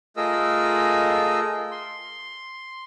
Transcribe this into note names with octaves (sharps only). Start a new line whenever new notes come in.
A3 F4 G#4 A#4 D#5 E6
C6